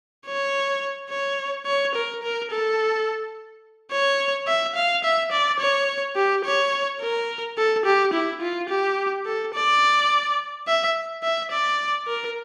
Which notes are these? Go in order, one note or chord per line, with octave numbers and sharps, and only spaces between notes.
C#5
C#5
C#5
A#4
A#4
A4
C#5
E5
F5
E5
D5
C#5
G4
C#5
A#4
A4
G4
E4
F4
G4
A4
D5
E5
E5
D5
A#4